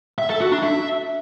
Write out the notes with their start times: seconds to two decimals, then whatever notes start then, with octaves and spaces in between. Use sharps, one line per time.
0.18 E5
0.29 A4
0.40 F#4
0.52 D4
0.63 E5